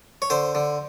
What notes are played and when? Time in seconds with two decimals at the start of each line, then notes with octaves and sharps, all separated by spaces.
0.22 C#5
0.30 D3 C5
0.55 D3